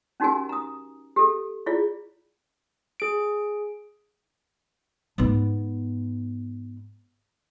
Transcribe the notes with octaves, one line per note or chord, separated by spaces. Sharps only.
C#4 D#4 F#4 G4 A#4 G#5
A#5 D#6
G4 A4
E4 F4 G#4 D5
G#4 D7
G#2 B3